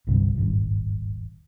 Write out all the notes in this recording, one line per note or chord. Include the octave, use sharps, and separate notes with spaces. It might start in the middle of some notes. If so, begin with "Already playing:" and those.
G1 C2 G2 D3
D#1 G#1 G2